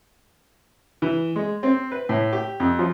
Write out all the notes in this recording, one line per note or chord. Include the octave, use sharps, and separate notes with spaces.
E3
G#3
C4
B4
A2
G4
F2
F3